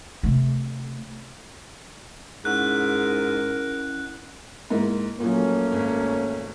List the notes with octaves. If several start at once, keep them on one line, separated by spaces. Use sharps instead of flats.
C3 A3
G#2 C#4 E4 A#4 F#5 F#6
G#2 A#3 E4
A#2 F3 F#3 A3 A#3 C#4
G#1